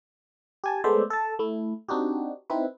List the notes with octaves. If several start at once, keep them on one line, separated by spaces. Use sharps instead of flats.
G4 G#5 A5
G#3 A3 B3 C5 D5 E5
A4 A5
A3 E4
C4 D4 D#4 F#4 G4
C4 D#4 E4 B4